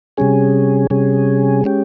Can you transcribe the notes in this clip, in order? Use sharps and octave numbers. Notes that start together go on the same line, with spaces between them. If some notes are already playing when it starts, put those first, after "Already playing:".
C3 G3 C#4 G#4
C3 G3 C#4 G#4
G#3 C#4 G4